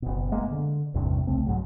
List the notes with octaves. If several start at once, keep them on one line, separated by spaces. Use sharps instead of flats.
F#1 B2
G#3 A#3 B3
D3
A1 E2 G2 C3
C2 C#3 A3 C4
B1 G#2 F#3